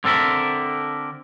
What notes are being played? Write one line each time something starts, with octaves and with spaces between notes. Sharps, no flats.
D3 C4 A4 A#4 E5